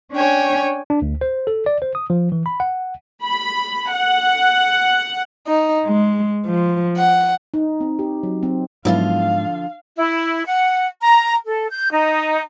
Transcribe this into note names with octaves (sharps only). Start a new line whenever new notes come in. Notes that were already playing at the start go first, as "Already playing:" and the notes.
C#4 D4 C#5 G5 G#5
D4
D2
C5
A4
D5
C5
D#6
F3
E3
B5
F#5
B5
F#5
D#4
G#3
F3
F#5
D#4
C4
G4
F#3
C4
G#2 D3 F3 F#3 B3 E4 F4 F5
E4
F#5
A#5
A4
G6
D#4